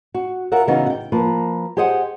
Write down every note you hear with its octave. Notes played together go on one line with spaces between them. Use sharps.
F#4
F4 F#4 A#4 E5 F#5
C#3 E3 B3 D#4 F4 F#4
F#5 G5
F3 A#3 B4
G4 G#4 C5 D#5 F#5 G#5